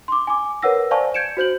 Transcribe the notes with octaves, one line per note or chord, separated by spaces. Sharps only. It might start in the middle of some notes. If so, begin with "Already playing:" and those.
C6 D6
G#5 D6
A#4 B4 C#5 F#5 E6 A#6
C5 D5 F5 G#5 A5 C#6
G6 G#6 C#7 D7 E7
F#4 C5 G6 F#7